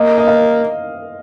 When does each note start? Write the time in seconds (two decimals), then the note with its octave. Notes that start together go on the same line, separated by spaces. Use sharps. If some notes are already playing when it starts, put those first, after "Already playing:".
Already playing: A#3 D#5
0.18 D#5
0.28 F5